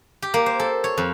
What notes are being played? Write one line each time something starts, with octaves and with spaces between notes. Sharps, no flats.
G4
A#3
C5
A4
C#5
F2